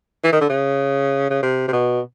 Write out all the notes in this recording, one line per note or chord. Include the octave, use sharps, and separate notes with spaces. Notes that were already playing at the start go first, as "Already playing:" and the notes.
E3
D#3
D3
C#3
C#3
C3
C3
B2